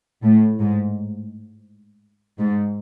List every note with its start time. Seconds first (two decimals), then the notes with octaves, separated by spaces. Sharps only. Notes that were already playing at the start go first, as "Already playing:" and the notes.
0.24 A2
0.60 G#2
2.39 G#2